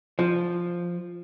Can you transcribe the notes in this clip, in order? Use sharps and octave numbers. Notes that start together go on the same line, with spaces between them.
F3